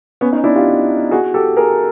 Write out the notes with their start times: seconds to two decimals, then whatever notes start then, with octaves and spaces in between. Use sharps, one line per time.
0.21 B3 C#4
0.33 C#4 D#4
0.44 D4 E4
0.55 F4 G4
1.11 F#4 G#4
1.34 G4 A4
1.57 G#4 A#4